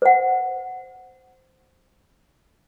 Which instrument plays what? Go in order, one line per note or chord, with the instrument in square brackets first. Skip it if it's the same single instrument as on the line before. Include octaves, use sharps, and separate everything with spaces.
[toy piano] C5 F#5